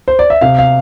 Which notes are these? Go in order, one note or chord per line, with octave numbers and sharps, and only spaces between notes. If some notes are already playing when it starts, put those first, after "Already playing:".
C5
D5
E5
C3 F5
F5